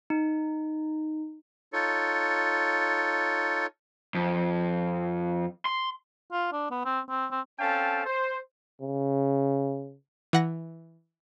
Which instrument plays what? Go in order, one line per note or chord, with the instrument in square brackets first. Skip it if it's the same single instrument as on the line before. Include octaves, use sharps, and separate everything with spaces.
[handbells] D#4
[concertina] D#4 F4 A4 C#5
[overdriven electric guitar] F2
C6
[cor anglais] F4
D4
B3
C4
C4
C4
[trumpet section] C4 C#4 A4 F5 G5 A5
C5
[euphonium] C#3
[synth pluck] E3 F#5 A#6